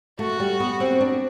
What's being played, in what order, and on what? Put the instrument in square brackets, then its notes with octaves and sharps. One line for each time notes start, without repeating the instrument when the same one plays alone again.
[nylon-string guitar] A3 [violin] F#4
[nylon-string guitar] G3
B3
C4
D4